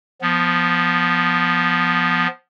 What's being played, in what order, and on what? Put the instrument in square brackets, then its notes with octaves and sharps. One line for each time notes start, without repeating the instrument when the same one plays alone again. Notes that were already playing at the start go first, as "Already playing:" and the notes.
[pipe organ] F3 B3